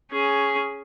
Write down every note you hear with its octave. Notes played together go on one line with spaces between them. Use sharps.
C#4 G#4